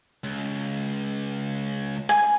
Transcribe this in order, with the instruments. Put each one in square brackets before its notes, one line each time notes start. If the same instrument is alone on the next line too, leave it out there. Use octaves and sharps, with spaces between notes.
[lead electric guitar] C#2
[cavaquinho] G#5